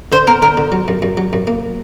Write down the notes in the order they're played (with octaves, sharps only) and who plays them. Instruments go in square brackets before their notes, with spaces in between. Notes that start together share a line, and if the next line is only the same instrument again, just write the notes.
[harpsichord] D3 [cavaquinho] C5
[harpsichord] B3 [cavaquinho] A#4
[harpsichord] D3 [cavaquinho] A#4
[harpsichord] D3
F#3
F#2
F#2
F#3
F#2
A#3